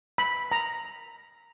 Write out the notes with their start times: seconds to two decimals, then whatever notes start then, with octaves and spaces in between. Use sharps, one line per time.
0.18 B5
0.52 A#5